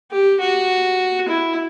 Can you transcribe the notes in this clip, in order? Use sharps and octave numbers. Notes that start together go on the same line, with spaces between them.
G4
F#4
E4